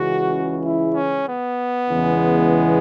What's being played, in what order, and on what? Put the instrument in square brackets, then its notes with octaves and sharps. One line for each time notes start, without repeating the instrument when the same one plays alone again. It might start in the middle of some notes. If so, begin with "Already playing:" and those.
Already playing: [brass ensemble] C#2 C#3 E3 G#3 F#4
E4
C#4
B3
E2 C#3 E3 G#3